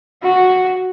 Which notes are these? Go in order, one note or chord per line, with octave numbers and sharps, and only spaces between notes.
F#4